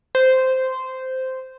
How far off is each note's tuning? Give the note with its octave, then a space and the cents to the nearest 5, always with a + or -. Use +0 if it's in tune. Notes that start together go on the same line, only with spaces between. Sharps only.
C5 -10